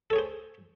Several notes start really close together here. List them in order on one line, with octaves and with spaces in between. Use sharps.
A4 C#5 G#4 C5